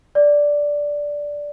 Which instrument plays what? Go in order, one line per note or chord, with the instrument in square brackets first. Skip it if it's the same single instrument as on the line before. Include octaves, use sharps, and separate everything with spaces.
[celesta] D5